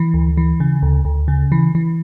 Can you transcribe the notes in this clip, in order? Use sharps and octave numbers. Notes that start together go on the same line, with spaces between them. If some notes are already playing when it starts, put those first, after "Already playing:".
Already playing: E3
D2
E3
C#3
D2
D2
C#3
E3
E3